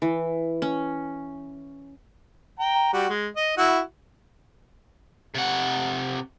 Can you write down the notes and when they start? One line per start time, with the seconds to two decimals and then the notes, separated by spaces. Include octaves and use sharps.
0.02 E3
0.62 C#4
2.59 G5 A#5
2.93 G3 F#4
3.09 G#3
3.36 D#5
3.57 E4 F#4
5.35 C3 F#5